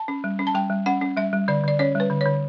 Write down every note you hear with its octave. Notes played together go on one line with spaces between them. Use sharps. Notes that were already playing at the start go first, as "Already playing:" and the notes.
Already playing: A5
C#4
G3
C#4
A5
G3 G5
G3
C#4 F#5
C#4
G3 E5
G3
D3 D5
D3 D5
C#4 C#5
G3
B4
D3
D3 C#5